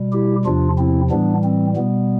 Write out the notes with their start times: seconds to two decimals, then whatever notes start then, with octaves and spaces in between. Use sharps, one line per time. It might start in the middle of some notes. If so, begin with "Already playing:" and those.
Already playing: B2 G3
0.13 E4 G4
0.45 E2 C3 F3 D4 F4
0.78 C4 E4
1.11 A2 E3 G3 B3 D4
1.44 C4
1.77 B2 G3 B3